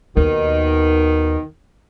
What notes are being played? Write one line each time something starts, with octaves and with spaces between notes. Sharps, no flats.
D#2 B2 D#3